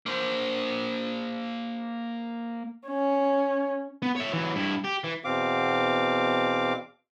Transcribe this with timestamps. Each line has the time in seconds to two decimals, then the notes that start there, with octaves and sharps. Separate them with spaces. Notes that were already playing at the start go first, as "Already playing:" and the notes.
0.06 A#3 C5
2.88 C#4
4.02 B3
4.16 C#5 E5
4.33 E3 F#3
4.55 G2 E4
4.84 G4
5.04 E3
5.24 E2 B2 C4 F5 D6